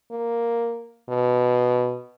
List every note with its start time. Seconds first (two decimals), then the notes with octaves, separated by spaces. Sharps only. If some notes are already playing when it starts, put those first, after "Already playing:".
0.11 A#3
1.09 B2